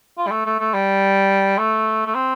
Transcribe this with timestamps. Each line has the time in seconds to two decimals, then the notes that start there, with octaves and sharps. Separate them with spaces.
0.18 F4
0.27 G3
0.31 A3
0.46 A3
0.60 A3
0.74 G3
1.58 A3
2.06 A3
2.15 C4